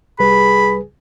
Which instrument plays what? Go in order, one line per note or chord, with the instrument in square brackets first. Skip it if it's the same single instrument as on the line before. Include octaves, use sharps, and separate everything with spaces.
[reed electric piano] C2 G3 B4 [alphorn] G#4 [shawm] B5